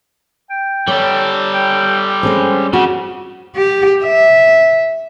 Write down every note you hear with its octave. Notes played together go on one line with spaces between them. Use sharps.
G5
G3 A4 C#5
G5
G#3 C#4 G#4 C5
C#3 F#4
G4
E5